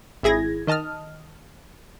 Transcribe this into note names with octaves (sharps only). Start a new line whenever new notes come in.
G#1 E4 G#4 G#6 A#6
D#3 D#5 A5 D#6 F6